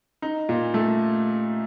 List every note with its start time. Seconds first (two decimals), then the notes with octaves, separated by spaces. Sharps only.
0.22 D#4
0.49 A#2
0.74 A3